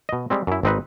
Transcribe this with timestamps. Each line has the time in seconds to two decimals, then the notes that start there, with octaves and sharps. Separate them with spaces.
0.09 B2 D#5
0.30 G3 G#3 C4
0.47 F#2 E4
0.63 G#1 C4 D#4 B4